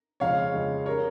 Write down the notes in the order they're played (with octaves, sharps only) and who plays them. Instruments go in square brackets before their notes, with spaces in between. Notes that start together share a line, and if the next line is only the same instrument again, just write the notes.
[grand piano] F2 C#3 G#3 C#5 F5
F2 C#3 G#3
G3 A#4 C#5